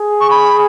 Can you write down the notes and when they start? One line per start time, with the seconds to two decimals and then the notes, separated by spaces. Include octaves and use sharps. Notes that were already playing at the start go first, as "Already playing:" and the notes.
Already playing: G#4
0.21 C#6
0.30 B5